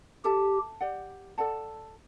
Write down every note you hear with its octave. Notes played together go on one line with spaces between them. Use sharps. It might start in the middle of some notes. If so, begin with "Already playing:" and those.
G4 A4 E5 A5
G4 D5 F#5
A4 D5 F#5 A5